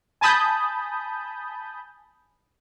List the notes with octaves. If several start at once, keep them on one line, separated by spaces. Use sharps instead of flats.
G#5 A5 B5 D#6 G6